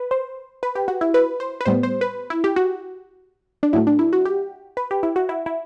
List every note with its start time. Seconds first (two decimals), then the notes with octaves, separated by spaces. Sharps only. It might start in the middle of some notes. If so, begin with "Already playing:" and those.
Already playing: B4
0.11 C5
0.63 B4
0.75 G4
0.88 F#4
1.01 E4
1.14 B4
1.40 C5
1.61 B4
1.65 A2 G3 B3 C5
1.83 C5
2.01 B4
2.30 E4
2.44 G4
2.56 F#4
3.63 D4
3.73 A2 F#3 A3 E4
3.87 D4
3.99 E4
4.13 F#4
4.25 G4
4.77 B4
4.91 G4
5.03 E4
5.16 F#4
5.29 E4
5.46 E4